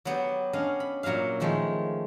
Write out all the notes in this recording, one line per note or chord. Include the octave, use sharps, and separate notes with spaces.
F#3 B3 G4
C#4 D4 D#5 F5
B5
A#2 F#3 F#4 E5 F5
D#3 F3 G#3 A3